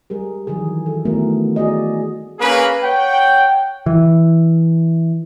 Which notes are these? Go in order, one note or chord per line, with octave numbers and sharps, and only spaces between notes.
G3 G#4 A#4
D#3 E3 F#3 G#4
A4
D#3 A3 B3 E4 F#4 A#4
F#4 G#4 D5 D#5
A#3 C#4 G#4 B4
C#5 F#5 G5
E3